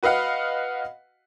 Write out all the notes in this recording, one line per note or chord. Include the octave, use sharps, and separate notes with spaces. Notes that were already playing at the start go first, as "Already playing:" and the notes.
F#4 B4 D#5 F5 F#5